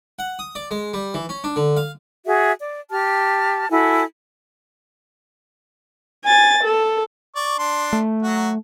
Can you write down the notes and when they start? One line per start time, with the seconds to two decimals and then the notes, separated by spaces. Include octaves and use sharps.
0.19 F#5
0.39 D#6
0.55 D5
0.71 G#3
0.93 G3
1.14 E3
1.29 C#4
1.44 D4
1.56 D3
1.77 F5
2.26 F#4 G#4 E5
2.60 D5
2.90 G4 A5 F6
3.70 E4 F#4 A4 G#5
6.25 G#5 A6
6.64 A4
7.36 D5 C#6
7.59 D4 C6
7.93 A3
8.23 F#3 F#4